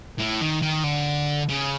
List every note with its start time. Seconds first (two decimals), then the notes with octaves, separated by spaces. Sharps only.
0.19 A2
0.41 D#3
0.62 D#3
0.84 D3
1.49 C#3